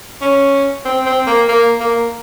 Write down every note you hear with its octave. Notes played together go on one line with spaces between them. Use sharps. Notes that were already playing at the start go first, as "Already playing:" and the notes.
C#4
C4
C4
A#3
A#3
A#3